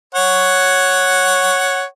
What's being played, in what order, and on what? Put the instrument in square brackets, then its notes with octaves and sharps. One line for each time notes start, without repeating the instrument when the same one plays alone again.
[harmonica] C#5 F#5